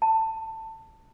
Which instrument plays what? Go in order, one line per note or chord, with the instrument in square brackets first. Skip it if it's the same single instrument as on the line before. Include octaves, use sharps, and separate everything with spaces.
[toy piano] A5